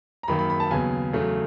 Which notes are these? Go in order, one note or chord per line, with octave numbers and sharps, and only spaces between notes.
A#5
F#2 D#3 F#3 A#3 B5
B5
B5
A5
D#2 C#3 F#3 B3 G#5
E2 C#3 F#3 A3